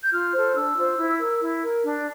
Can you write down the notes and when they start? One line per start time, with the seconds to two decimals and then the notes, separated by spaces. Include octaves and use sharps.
0.02 G6
0.12 F4 F6
0.33 A4 C5
0.55 D4 E6
0.77 F4 C5
0.98 E4
1.20 A#4
1.41 E4
1.63 A#4
1.84 D4